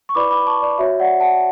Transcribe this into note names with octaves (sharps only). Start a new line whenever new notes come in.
C#6
E4 B4 D5 B5 D6
B5 D6
A5 C#6
D5
F#4 C#5 E5
D5 F#5
F#5 A5